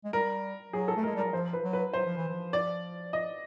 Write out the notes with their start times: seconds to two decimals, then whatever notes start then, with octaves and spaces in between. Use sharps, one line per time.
0.04 G#3
0.13 G3 A#4
0.73 F#3 G#4
0.88 A4
0.97 A3
1.03 G#3 A#4
1.15 G3 A#4
1.24 F#3
1.33 F3 C5
1.53 B4
1.63 F#3
1.73 B4
1.93 F#3 C5
2.05 F3
2.17 E3
2.29 F3
2.53 D5
3.13 D#5